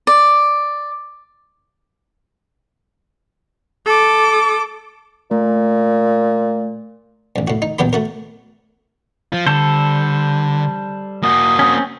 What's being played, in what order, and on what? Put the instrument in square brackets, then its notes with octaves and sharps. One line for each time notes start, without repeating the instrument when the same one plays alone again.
[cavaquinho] D5
[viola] A4 D6
[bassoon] A#2 [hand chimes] A3
[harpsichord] A1 G2
A2 F#4
D#4
A#1 E2 F#3 B3 G4 B5
A3 F#4 A#4
[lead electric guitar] F3 F4
[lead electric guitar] D3 [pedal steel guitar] G3 A4 C5
[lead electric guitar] A#3 F#4 [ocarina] D#6
[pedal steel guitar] C4 C#4